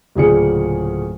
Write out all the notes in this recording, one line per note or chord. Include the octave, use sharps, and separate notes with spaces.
D1 A#2 C#3 G#4 D5 C#7